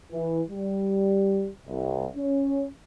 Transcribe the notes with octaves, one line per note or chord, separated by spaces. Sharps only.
E3
G3
C2
C#4